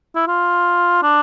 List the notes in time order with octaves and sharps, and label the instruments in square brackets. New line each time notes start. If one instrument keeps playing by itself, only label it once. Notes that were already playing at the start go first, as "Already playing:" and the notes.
[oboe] E4
F4
D4